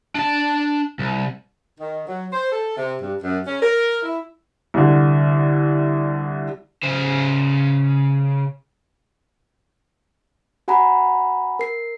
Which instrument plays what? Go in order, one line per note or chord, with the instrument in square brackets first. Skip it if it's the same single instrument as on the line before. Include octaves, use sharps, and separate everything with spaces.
[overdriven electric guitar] D4 A5
C2
[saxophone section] D#3
F#3
C5
A4
C3
G2
F#2
C#4
A#4
E4
[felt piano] C2 D3
[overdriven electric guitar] C#3 C5
[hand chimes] F#4 F#5 G#5 A#5 B5
A#4 C7